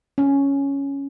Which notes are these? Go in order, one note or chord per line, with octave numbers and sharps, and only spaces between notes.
C#4